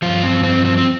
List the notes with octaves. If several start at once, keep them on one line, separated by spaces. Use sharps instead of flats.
G2 F3 F4
C4
C4
C4
C4